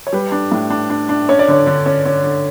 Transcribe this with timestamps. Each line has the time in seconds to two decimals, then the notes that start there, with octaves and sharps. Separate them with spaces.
0.07 C#5
0.13 G3 B4
0.32 D4
0.52 A2
0.70 D4
0.90 D4
1.09 D4
1.29 C#4 C#5
1.39 D5
1.48 D3 C#5
1.67 D3
1.86 C#4
2.06 C#4
2.24 D3